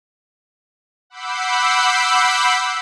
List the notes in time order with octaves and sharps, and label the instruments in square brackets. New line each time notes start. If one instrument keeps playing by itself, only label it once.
[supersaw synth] F#5 B5 D6 E6 G6 C7